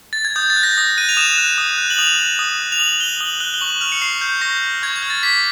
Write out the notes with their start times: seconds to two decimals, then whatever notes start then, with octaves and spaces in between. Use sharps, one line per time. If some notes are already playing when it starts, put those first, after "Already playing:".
0.13 A6
0.25 G#6
0.36 D#6 G6
0.50 A6
0.56 F#6
0.63 A#6
0.77 D#6 A#6
0.97 F#6 D#7
1.09 F7
1.17 D#6 E7
1.38 F#6
1.58 D#6
1.78 F#6
1.90 F#7
1.98 D#6 F7
2.19 F#6
2.39 D#6
2.60 F#6
2.72 F7
2.79 D#6 F#7
3.00 F#6 G7
3.20 D#6 F#7
3.40 F#6 G7
3.54 G7
3.61 C#6 F#7
3.81 F6 F7
3.92 C#7
4.02 C#6 C7
4.21 F6 G6
4.41 C#6 A#6
4.62 F6
4.82 C#6 G#6
4.96 G#6
5.03 F6
5.10 A6
5.23 D6 B6